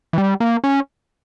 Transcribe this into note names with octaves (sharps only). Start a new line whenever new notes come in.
E3
G3
A#3
C#4